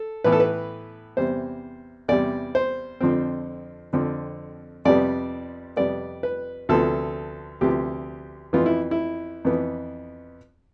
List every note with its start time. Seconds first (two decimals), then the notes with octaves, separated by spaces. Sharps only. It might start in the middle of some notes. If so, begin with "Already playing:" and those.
Already playing: A4
0.24 A2 E3 B3 B4
0.32 A4
0.40 B4
1.17 E2 C3 G3 C5
2.08 E2 C3 G3 D5
2.55 C5
3.00 F2 D3 F3 C4
3.93 F2 D3 F3 C4
4.85 F2 C3 G3 B3 D5
5.77 F2 C3 G3 B3 D5
6.23 B4
6.69 D2 C3 F3 B3 A4
7.61 D2 C3 F3 B3 G4
8.53 F2 E3 B3 F4
8.66 E4
8.91 E4
9.45 F2 E3 B3